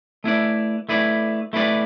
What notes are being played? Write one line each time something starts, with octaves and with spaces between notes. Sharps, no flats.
A3 E4 B4 D5
A3 E4 B4 D5
A3 E4 B4 D5